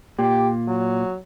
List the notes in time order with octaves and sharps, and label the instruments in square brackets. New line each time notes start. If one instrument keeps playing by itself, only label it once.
[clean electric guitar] A#2 [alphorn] G4
[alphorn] F#3